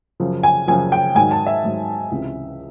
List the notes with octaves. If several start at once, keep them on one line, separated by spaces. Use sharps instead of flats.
F#2 C#3 F3
G#5
F#2 C#3 F3 G#5
G5
G#2 D#3 F#3 G#5
A5
E5
G#2 D#3 F#3
C#2 C3 E3